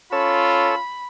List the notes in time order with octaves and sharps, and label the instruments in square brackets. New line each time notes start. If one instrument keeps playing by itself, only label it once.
[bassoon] C#4 [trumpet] F4 [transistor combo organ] A4 C#5 E6 [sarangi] B5